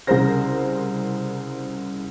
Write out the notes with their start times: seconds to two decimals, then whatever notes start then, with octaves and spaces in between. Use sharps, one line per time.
0.07 C2 C#3 G#4 A#4 C5 A#6